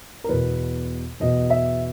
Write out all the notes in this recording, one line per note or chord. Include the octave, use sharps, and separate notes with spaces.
A#4
E2 B2 B4
E2 B2 D#5
E5